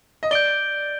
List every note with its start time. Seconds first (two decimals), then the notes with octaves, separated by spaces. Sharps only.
0.23 D#5
0.31 D5 G6 D7 G7